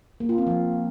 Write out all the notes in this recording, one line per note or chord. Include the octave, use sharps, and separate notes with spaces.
A#3
F4
C4
F3